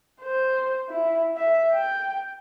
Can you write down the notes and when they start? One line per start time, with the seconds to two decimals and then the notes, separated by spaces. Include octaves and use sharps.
0.21 C5
0.89 E4
1.36 E5
1.72 G5